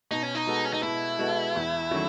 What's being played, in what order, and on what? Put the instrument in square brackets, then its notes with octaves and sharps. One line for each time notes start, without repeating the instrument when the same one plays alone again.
[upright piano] B2 [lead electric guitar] D#4
[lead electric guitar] C#4
D#4
[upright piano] G#3 B3 F#4 A4
[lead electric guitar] C#4
D#4
[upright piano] B2 [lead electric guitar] E4
[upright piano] G#3 B3 F#4 A4
E2
D#3 F#3 A3 C#4